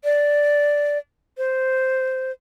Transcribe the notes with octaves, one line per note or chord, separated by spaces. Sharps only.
D5
C5